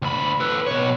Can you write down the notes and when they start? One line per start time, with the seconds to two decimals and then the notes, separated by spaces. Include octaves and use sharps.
0.02 D2 B5
0.40 A4 B4
0.66 B2 C#5